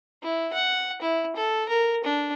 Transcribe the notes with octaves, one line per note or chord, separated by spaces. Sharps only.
E4
F#5
E4
A4
A#4
D4